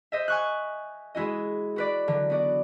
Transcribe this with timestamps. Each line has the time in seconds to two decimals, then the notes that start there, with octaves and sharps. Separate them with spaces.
0.12 C5 D#5 E5
0.28 G#5 C#6 F#6
1.15 G#3 E4 F#4 D#5
1.76 F#4 B4 D5
2.08 D3 F#3
2.30 B3 F#4 D5